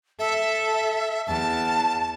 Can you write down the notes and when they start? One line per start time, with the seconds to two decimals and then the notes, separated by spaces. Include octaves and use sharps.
0.19 A4 E5
1.27 E2 A5